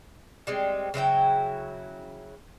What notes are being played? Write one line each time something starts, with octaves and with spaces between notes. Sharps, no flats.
G3 G#3 C4
C#3 F#3 E4 G5